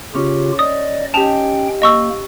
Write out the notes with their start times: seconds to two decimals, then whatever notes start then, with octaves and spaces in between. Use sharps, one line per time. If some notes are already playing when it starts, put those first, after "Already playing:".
0.15 C#3 C#4 F4 G4
0.59 D5 D#5 D#6
1.14 C#4 D#4 G4 G5 A5 F7
1.82 A#3 D#5 C#6 E6